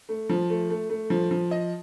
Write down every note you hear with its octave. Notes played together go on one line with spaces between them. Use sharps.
A3
F3
A3
A3
A3
F3
F3
D#5